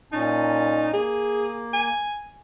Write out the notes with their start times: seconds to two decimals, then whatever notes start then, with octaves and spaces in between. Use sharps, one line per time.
0.12 A#2 C#4 D#4 A5
0.93 A#3 G#4
1.73 G#5